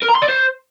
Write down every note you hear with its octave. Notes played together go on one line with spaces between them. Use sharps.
A#4
A#5
C6
D5
C5